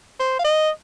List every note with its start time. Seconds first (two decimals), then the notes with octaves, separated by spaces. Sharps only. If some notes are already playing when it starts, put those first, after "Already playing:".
0.20 C5
0.39 F5
0.44 D#5